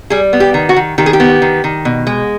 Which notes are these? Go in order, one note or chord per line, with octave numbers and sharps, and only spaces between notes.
G3 G#4
B3
G4
D#3
F#4
D#3
D#3 G4
G#4
G4
B3
D#3
D#3
B2
G#3